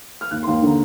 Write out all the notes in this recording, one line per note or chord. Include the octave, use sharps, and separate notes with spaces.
F6
D#2 F#6
C6
D#2
D3 A#5